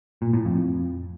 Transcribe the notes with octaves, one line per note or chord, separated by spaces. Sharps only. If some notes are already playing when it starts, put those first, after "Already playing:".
A#2
A2
F2